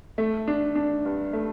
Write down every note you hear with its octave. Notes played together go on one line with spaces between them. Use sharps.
A3
D4
D4
G2
A3